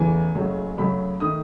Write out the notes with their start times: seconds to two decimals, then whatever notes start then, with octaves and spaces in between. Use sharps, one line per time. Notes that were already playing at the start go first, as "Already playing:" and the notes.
Already playing: E2 C#3 E3 A3 G#5
0.35 F#1 F#2 C#3 F#3 A3
0.77 F#2 C#3 F#3 A3 B5
1.20 D#3 A3 D#6